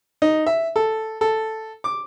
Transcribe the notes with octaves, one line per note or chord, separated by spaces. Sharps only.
D#4
E5
A4
A4
D6